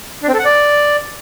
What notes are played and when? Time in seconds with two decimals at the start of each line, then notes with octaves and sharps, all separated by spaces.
0.23 D4
0.28 C4
0.34 A4
0.39 F#5
0.45 D5